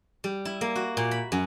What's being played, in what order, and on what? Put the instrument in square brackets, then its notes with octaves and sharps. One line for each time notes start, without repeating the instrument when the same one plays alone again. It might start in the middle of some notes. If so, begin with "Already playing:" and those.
[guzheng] G3
E4
A#3
F#4
A#2
B5
F#2